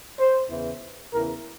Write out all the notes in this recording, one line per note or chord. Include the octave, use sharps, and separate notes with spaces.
C5
E2 C#3 E3
E2 C#3 E3 A#4